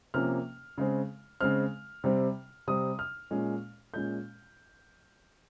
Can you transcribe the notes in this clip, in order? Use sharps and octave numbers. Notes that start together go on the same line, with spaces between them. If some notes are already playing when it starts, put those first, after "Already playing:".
C3 F3 A#3 C#4 F6
C#3 G#3 C4
C#3 G#3 C4 F6
C3 G3 C4
C3 G3 C4 D#6
F6
A#2 G#3 C#4
A#2 G#3 C#4 G6